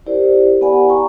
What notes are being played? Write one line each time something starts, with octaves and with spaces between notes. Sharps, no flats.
E4 G4 A#4 C5 D5
B3 G4 D5 F#5 G#5 B5
E4 G5 A#5 C#6